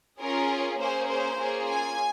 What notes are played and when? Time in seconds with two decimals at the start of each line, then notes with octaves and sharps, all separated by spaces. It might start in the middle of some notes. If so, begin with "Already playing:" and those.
0.20 C#4 F4 G#4 A#4
0.80 A#3 C#4 G#4 C5
1.09 C5
1.38 A#3 C#4 F4 G#4
1.68 G#5